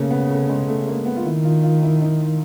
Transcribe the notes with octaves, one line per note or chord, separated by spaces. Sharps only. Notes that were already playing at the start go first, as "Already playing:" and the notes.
Already playing: C#3 A3 A#3
B3
A3
G#3
A3
A#3
B3
F4
D#3 E4
F4
F4
E4
D#4